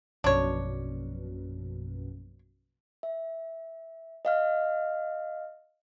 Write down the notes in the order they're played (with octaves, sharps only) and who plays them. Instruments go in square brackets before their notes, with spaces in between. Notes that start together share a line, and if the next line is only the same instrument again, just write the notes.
[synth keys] A#1 F#2 B2 [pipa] D4 C#5
[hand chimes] E5
D#5 F5 F6